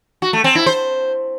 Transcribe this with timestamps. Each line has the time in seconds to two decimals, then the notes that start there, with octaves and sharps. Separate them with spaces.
0.22 F#4
0.33 A3
0.44 C4
0.55 E4
0.66 C5